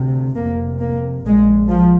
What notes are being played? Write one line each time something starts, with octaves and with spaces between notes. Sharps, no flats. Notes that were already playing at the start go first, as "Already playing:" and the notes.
Already playing: D2 C3
F1 F2 C3 A#3
A#3
A#1 A#2 G#3
F3